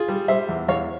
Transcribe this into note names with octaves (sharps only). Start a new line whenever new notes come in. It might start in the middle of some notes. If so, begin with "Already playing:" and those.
Already playing: F4 G#4
G3
G3 C5 E5
E2
E2 C#5 F5